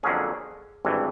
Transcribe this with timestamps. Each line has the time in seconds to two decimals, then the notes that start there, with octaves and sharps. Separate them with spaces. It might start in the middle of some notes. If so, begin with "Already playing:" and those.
0.03 F2 D3 F#3 A#3 C#4 G#4
0.85 G#1 G2 E3